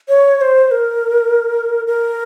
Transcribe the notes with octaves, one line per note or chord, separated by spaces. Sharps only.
C#5
C#5
C5
C5
A#4
A#4